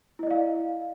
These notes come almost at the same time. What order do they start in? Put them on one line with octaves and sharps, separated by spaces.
E4 D#5 D5 F5